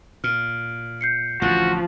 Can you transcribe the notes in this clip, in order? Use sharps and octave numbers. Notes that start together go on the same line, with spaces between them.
A#2 F6
G6 C7 C#7
A1 D3 F3 F#4